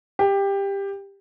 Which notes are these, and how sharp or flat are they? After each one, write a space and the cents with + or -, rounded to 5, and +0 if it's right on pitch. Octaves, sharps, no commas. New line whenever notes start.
G4 +15